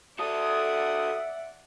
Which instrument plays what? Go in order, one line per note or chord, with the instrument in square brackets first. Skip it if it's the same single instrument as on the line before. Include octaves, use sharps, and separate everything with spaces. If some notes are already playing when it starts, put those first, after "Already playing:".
[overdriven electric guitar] F#4 A4 [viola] D5 F#5 [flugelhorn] E5 [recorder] D#6